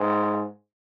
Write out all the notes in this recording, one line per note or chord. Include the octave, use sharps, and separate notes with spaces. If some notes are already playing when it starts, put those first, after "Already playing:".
Already playing: G#2